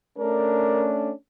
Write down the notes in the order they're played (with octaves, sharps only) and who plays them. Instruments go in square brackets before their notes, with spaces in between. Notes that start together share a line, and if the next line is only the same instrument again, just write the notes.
[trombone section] A3 C#4 D4 [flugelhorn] A#4